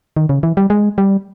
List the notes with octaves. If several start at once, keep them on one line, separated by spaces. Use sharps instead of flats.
D#3
C#3
E3
G3
G#3
G3